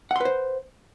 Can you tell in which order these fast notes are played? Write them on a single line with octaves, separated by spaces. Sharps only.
F#5 C6 B4 C5